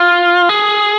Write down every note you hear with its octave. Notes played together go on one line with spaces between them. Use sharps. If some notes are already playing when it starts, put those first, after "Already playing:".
Already playing: F4
G#4